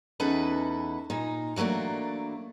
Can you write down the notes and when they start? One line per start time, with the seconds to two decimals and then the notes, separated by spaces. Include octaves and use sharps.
0.20 E2 C#4 D#4 E4 A4 B4
1.10 A#2 D#4
1.56 E3 F#3 A3 A#3 D4